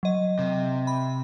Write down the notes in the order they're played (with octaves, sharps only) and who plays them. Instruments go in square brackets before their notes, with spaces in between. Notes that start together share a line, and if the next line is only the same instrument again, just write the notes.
[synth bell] F#3 D#5
[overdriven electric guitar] C3
[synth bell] B5